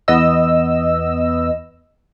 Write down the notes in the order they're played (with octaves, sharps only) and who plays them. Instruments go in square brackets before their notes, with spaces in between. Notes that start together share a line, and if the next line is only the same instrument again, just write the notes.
[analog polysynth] E2 B3 D#5 E6